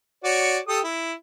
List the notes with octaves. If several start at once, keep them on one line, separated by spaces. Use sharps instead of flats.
F#4 C#5 D5
G4 A4 D#6
E4